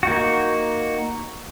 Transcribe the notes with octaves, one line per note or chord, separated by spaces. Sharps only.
A#3 D#4 F#4